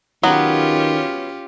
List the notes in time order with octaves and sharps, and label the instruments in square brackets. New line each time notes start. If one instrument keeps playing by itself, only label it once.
[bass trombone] D#3 [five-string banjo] F#3 B3 [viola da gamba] C#4 F4 G4